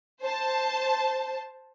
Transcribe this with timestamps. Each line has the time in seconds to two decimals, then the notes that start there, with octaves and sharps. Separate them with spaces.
0.22 C5 A5